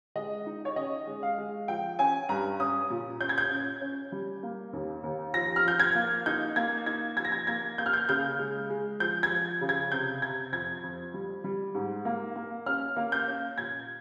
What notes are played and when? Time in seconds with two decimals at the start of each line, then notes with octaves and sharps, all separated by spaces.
0.16 G#3 D#5
0.46 D#4
0.65 C#5
0.76 C#4 D#5
1.07 G#3
1.23 F5
1.38 G#3
1.68 F3 G5
1.99 C#4 G#5
2.29 G2 A#5
2.60 C#4 D#6
2.90 A#2
3.21 C#4 G6
3.29 G#6
3.38 G6
3.51 C#4
3.81 C#4
4.12 G3
4.43 A#3
4.73 D#2
5.03 D#2
5.34 F3 A#6
5.56 F6
5.64 F3 G6
5.80 G#6
5.95 A#3
6.26 D#4 G6
6.56 A#3 G#6
6.86 D#4 G#6
7.17 F3 G#6
7.25 A#6
7.32 G#6
7.47 A#3 G#6
7.78 A#3 G6
7.86 F6
7.93 G6
8.08 C#3 G6
8.39 G#3
8.70 G#3
9.00 F3 G6
9.23 G#6
9.31 F3
9.61 C#3
9.69 G#6
9.92 C3 G6
10.22 C3 G#6
10.52 F2 G#6
10.83 F2
11.14 G3
11.44 G3
11.75 G#2
12.05 A#3
12.36 A#3
12.66 C#4 F6
12.96 A#3
13.12 G6
13.28 C#4
13.58 A#2 G#6